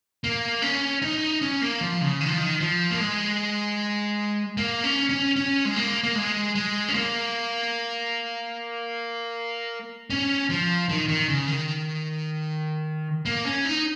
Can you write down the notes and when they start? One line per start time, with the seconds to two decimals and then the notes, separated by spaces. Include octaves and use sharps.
0.24 A#3
0.62 C#4
1.02 D#4
1.42 C#4
1.62 A#3
1.81 F3
2.01 C#3
2.21 D#3
2.28 F3
2.37 D#3
2.60 F3
2.91 A#3
3.00 G#3
4.57 A#3
4.84 C#4
5.09 C#4
5.36 C#4
5.65 G#3
5.76 A#3
6.03 A#3
6.15 G#3
6.55 G#3
6.88 C#4
6.94 A#3
10.10 C#4
10.49 F3
10.89 D#3
11.09 D#3
11.28 C#3
11.48 D#3
13.25 A#3
13.45 C#4
13.65 D#4